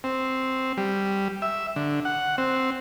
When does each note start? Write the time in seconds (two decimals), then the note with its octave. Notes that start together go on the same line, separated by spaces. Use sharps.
0.04 C4
0.78 G3
1.42 E5
1.76 D3
2.05 F#5
2.38 C4